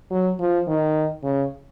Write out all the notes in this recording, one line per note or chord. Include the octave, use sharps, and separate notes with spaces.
F#3
F3
D#3
C#3